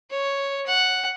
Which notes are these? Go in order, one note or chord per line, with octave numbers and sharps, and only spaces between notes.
C#5
F#5